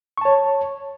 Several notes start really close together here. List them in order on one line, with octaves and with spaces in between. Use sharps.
C#6 A5 C#5